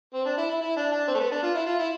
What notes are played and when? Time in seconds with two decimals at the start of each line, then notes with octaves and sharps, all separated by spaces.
0.14 C4
0.25 D4
0.38 E4
0.50 E4
0.61 E4
0.76 D4
0.92 D4
1.08 C4
1.15 A3
1.20 B3
1.31 D4
1.43 F4
1.55 E4
1.66 F4
1.79 E4